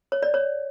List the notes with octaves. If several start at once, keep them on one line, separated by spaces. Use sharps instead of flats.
C#5
D5
C#5